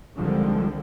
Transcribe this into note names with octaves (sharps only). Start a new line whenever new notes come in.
C2 D3 D#3 F3 G3 G#3